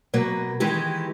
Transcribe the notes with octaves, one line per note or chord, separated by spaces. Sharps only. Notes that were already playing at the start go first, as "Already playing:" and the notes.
B2 F#3 A#3
D#3 E3 G#3 G4